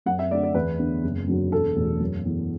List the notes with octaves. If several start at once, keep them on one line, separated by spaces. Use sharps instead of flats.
F#2 F#5
E5
D3 A3 D5
D5
E2 B4
D3 B3
F#1
F#2 D3 F#3
E1 A4
E2 B2 A3
F#2
E3 B3